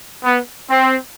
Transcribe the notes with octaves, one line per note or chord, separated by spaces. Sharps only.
B3
C4